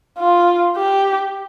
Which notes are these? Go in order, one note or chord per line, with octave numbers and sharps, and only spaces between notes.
F4
G4